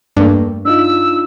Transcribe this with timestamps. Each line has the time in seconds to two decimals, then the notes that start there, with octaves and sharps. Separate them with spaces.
0.17 E2 G2 A3 A#3
0.65 D4 D#4 F4 E6